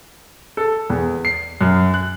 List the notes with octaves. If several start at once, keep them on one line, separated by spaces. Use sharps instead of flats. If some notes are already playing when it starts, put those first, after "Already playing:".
A4
E2
C7
F#2
F#6